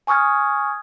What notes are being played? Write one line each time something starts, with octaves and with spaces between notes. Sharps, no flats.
G#5 C#6 D#6 F6 G#6